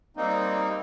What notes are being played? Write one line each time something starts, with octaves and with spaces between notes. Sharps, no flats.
G3 A#3 C4 D#4